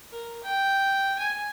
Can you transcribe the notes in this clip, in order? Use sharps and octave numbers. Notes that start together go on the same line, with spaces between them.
A#4
G5
G#5